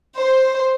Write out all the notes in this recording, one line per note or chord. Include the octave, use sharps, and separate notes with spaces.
C5